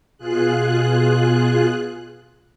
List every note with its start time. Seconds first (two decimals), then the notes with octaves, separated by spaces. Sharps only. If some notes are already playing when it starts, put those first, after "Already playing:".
0.18 B2 F4 G#4 F#6